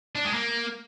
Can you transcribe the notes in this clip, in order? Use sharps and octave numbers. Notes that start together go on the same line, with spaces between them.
D4
G#3
A#3